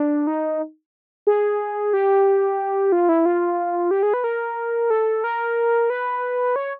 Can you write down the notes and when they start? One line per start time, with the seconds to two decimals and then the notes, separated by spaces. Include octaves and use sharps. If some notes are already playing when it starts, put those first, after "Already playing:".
Already playing: D4
0.27 D#4
1.27 G#4
1.93 G4
2.92 F4
3.09 E4
3.26 F4
3.91 G4
4.03 G#4
4.14 B4
4.24 A#4
4.90 A4
5.24 A#4
5.90 B4
6.56 C#5